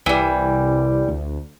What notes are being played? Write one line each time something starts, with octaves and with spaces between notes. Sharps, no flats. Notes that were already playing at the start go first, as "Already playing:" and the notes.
C2 E3 G3
D2